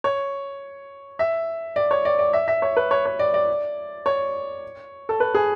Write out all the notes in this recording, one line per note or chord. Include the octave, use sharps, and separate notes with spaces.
C#5
E5
D5
C#5
D5
D5
E5
E5
C#5
B4
C#5
C#5
D5
D5
C#5
A4
B4
G#4